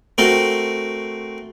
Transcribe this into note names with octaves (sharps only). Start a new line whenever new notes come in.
A3 C4 F#4 A#4